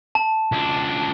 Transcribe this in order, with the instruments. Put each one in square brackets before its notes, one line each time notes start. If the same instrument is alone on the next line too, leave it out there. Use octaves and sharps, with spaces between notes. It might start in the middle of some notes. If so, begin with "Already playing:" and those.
[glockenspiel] A5
[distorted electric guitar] C#2 D4